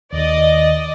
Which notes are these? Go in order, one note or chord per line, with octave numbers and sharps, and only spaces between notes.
D#2 D#3 D5 D#5